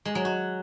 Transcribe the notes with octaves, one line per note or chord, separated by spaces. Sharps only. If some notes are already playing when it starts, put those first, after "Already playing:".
G#3
F#3
F#4